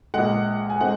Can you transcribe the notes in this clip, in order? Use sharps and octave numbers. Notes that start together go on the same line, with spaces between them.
A#1 A#2 G#3 F#5
G#5
G#3 C4 F#5